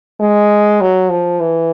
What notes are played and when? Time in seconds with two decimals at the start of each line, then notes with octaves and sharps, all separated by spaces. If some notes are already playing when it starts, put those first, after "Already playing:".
0.20 G#3
0.81 F#3
1.10 F3
1.40 E3